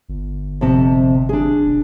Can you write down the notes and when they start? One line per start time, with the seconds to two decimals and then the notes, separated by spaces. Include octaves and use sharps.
0.09 G1
0.61 F2 C3 A5
1.29 D4 G#4
1.64 E1